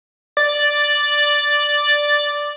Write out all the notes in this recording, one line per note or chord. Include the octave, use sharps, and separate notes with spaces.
D5